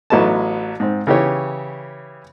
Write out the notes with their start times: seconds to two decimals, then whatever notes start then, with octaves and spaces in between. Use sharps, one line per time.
0.10 A1 F#3 B3 D#5 A5
0.80 G#2 C4
1.07 C#3 E3 G4 C#5